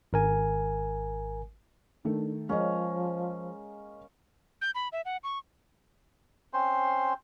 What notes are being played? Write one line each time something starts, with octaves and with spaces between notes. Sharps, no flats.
G#1 A#4 G#5
D#3 A3 D4
F3 G#3 A#3 C#4 D#5
G6
B5
E5
F#5
C#6
C4 C#4 C5 C6